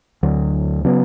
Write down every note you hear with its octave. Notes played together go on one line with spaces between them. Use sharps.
D2 D3 F#3
C#3 F#3 B3